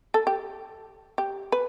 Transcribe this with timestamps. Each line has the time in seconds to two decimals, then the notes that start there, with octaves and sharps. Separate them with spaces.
0.14 A4
0.27 G4
1.18 G4
1.52 B4